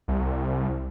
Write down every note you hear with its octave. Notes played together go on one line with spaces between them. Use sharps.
C2